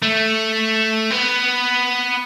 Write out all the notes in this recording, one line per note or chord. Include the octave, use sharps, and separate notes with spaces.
A3
B3